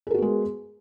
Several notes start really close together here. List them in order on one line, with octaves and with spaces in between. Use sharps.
G#4 A#4 F#4 B3 G#3